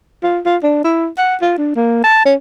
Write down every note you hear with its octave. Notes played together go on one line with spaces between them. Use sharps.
F4
F4
D4
E4
F#5
F4
D4
A#3
A5
C#4